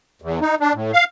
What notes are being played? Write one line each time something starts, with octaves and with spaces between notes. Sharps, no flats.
E2
D#4
D4
A2
F5